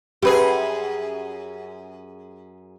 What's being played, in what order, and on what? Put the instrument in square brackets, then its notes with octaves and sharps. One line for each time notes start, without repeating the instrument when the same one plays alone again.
[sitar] F#2 G#4 [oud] G4 B4